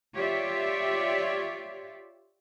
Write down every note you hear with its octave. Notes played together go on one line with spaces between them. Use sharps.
F4 G4 C#5 D5 E5